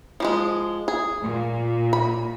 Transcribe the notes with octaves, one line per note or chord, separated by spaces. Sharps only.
F3 G3 G#3
G#4
A#2
B5